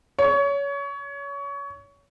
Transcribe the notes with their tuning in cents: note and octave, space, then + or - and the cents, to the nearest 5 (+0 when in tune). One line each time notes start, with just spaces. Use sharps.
C#5 +25